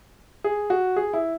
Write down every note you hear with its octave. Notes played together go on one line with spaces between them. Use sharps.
G#4
F#4
G#4
E4